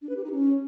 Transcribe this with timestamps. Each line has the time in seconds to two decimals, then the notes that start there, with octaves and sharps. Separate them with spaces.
0.02 D4
0.09 B4
0.17 G4
0.24 D#4
0.31 C#4